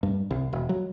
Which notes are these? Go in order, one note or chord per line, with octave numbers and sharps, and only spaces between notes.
G2
C2
E1
F#3